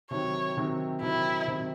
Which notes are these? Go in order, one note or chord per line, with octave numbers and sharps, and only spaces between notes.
C3 D#3 F#3 C4 C#5
C3 D#3 F#3 C4
C3 D#3 F#3 C4 E4
C3 D#3 F#3 C4